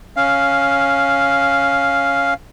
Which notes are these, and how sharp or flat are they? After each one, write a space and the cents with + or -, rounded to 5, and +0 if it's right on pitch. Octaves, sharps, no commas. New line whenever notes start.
C#4 +0 F5 +0